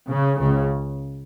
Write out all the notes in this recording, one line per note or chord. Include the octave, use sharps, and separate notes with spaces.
C#3
C#2 C#3